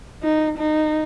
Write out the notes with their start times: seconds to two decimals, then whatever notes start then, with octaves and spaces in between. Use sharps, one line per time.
0.23 D#4
0.58 D#4